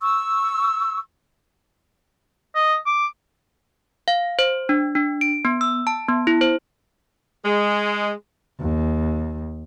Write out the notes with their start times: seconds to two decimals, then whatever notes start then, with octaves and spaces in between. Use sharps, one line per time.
0.01 C#6 E6
2.55 D#5
2.86 D6
4.08 F5
4.39 C5
4.69 D4
4.95 D4
5.21 D7
5.45 B3
5.61 E6
5.87 A5
6.09 B3
6.27 E4
6.41 C5
7.45 G#3
8.60 D#2